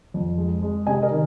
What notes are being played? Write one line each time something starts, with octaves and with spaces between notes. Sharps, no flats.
F2
G#3
G#3
C3 D#5 G#5
A#4 D#5
D#3